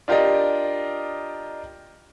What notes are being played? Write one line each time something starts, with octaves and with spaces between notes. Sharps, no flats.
D4 F4 G4 A#4 D5 D#5